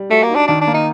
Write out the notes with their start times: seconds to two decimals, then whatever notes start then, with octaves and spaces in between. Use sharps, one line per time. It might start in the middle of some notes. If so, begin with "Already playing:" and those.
Already playing: G3
0.10 A3 F#4
0.23 A#3
0.29 D#4
0.35 D4
0.47 D#3 D4
0.61 D4
0.67 A#3
0.74 D#4